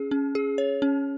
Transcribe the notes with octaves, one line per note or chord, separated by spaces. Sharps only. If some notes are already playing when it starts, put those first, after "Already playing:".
Already playing: C#4 G#4
C#4
G#4
C#5
C#4